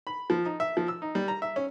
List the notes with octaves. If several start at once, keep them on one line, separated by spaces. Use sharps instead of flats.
B5
F3
D#4
E5
F3
E6
D#4
G3
A#5
E5
C#4